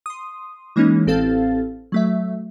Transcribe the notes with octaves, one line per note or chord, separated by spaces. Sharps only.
C6 D#6
E3 G#3 A#3 C#4 D#4
A1 C4 A4 F5 A6
F#3 A3 E5